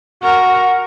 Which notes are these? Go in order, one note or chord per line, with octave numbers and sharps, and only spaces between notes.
F#4 A#4 F#5